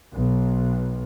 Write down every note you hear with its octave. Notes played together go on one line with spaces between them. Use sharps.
B1